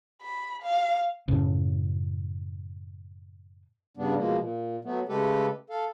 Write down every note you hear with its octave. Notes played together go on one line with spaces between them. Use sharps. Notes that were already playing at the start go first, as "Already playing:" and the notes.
B5
F5
F#2 A2 C#3
G2 C#3 G3 B3 D4
B2 F3 G#3 A#3
A#2
F#3 A3 B3
C#3 G#3 A3 G4 A4 B4
A4 F5